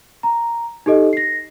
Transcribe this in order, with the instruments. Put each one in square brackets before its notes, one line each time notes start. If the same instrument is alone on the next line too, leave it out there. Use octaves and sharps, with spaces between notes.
[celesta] A#5
D#4 G4 A4 D#5
A#6 C7